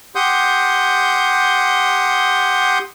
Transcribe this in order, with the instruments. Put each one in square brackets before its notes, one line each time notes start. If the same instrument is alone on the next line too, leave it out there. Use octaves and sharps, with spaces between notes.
[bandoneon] G4 F#5 C6 D#6 G6